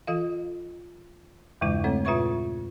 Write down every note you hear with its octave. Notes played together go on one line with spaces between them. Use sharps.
E3 F4 A4 D#5 F5
E2 G2 C#3 E3 G#3 E4
A3 C4 A4 C#5 F#5
A#2 F4 B4 E5 C#6 G#6